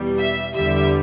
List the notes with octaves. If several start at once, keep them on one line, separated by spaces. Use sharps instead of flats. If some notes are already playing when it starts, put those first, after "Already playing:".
Already playing: E2 B2 G3
E5
E2 D3 G3 E5